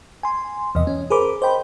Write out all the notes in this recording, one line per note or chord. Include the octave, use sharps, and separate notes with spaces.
G#5 C6
E2 C3 D#5
C#4
G#4 A#4 C5 B5 D6
C5 D#5 G5 B5